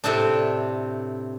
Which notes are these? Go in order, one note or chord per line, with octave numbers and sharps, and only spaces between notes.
A2 C3 C4 D4